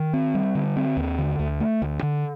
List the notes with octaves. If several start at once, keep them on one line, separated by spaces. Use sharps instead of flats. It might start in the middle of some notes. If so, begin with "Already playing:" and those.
Already playing: D#3
C4
G3
D3
C4
D#2
D3
D2
A3
D2
D3